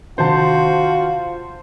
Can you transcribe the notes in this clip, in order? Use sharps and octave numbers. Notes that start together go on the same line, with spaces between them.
C3 D#3 D4 F4 F#4 C5 A5